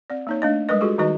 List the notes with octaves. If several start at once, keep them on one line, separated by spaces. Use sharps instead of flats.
C4 D5
A#3 D#4 C#5
A3 D4 D#5
G3 G#3 A#4 B4 D#5
G#3 F4 F#4 G#4 A4
D#3 G3 D#4 F#4 B4 D#5